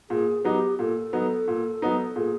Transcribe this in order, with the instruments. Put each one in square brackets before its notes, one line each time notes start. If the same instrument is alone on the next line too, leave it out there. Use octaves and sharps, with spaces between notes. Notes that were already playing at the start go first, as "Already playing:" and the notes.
[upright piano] A#2 [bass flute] G#4
[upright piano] F#3 B3 D#4 [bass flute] G4
[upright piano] A#2 [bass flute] A4
[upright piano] F#3 B3 D#4
A#2
F#3 B3 D#4
[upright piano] A#2 [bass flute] G#4